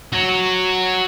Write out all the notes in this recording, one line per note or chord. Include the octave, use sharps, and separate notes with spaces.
F#4 C#5